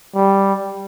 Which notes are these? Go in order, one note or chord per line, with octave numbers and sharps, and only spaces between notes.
G3